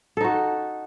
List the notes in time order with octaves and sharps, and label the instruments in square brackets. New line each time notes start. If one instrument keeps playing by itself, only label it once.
[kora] A4
D#4
F#4